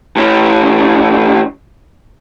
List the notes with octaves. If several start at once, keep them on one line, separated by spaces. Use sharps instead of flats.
A2 C#4